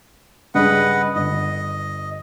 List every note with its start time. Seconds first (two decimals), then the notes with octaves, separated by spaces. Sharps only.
0.55 G2 C#3 B4 D#5 F#5
1.16 G1 D#5